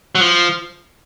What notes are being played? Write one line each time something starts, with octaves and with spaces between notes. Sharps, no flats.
F#3
F3